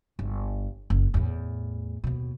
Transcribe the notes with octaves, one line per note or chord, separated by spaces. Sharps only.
G1
F#1
E2 A2
D#2 B2